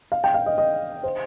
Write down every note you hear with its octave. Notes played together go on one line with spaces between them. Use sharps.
F5
G5
F5
D#5
D#5
C5